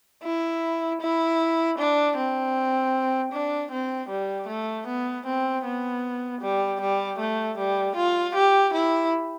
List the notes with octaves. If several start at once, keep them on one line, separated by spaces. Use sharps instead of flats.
E4
E4
D4
C4
D4
C4
G3
A3
B3
C4
B3
G3
G3
A3
G3
F4
G4
E4